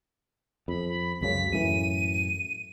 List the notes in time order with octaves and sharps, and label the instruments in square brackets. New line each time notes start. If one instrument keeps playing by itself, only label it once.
[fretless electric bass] F2 [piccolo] B5
[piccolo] B5
[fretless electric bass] C#2 F#2 C#3 [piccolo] B6
[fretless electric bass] F#2 A2 E3 [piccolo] D#7